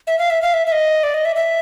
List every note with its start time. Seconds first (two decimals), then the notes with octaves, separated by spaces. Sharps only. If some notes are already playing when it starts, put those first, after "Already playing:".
0.07 E5
0.19 F5
0.30 E5
0.42 F5
0.54 E5
0.67 E5
0.72 D#5
1.03 D5
1.14 D#5
1.25 E5
1.36 E5